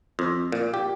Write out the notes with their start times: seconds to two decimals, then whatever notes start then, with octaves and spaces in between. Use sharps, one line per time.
0.19 F2
0.52 A#2
0.74 G4